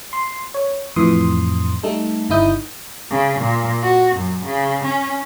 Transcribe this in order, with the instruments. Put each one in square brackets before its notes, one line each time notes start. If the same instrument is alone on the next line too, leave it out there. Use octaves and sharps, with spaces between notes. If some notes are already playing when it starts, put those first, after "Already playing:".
[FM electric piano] C6
C#5
F2 A2 E3 C6 D#6
G3 A3 D#4 A4
G1 C#3 D#4 E4 D#6 G6
[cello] C#3
A#2
F#4
F#2
C#3
C#4